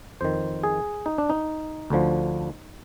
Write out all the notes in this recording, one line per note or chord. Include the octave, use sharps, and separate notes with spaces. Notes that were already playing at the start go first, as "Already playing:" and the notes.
F2 D#3 C5
G#4
D#4
D4
D#4
D2 D3 F3